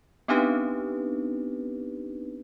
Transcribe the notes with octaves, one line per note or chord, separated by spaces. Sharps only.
B3 C4 D4 D#4 G4 B4